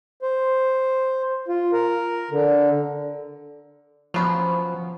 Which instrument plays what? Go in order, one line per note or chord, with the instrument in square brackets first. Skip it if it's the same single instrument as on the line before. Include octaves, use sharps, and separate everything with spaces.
[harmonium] C5
F4
A#4
D3
[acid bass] F3 [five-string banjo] F#3 B3 C#4